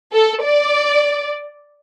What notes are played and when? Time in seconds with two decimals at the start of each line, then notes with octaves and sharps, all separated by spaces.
0.13 A4
0.43 D5